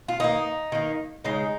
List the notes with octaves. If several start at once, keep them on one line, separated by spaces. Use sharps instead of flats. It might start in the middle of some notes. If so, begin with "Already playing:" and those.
F4
D#3 A#3 D#4
D#3 A#3
C#3 G#3 D#4